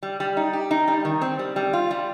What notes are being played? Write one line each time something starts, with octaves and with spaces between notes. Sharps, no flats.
G3
G3
D#4
G4
D#4
G3
D#3
C4
G3
G3
F4
G3